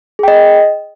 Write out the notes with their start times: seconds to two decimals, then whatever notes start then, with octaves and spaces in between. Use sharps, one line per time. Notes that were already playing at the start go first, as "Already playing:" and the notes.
0.19 G#4
0.23 G5
0.28 D#5